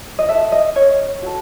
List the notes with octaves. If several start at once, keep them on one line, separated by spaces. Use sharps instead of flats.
D#5
F#4 A4 E5
D#5
C#4 C#5
F#4 A4